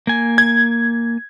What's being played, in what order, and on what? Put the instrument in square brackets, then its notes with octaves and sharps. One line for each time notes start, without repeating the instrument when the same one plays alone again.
[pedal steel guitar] A#3 G#5
[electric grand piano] G#6